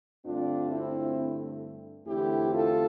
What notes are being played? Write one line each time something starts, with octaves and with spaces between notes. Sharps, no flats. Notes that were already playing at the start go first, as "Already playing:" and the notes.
G2 D3 A3 C4 D4 F4
C4 E4
E2 D3 A3 C4 E4 G4
F4 A4